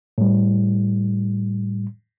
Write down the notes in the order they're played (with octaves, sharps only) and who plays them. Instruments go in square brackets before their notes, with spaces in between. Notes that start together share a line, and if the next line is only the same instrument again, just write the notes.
[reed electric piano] A2 G3